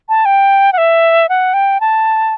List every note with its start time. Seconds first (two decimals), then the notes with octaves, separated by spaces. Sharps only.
0.09 A5
0.25 G5
0.73 F#5
0.78 E5
1.29 F#5
1.54 G5
1.81 A5